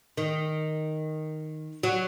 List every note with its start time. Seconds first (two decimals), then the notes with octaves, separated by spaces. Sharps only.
0.17 D#3
1.83 F#3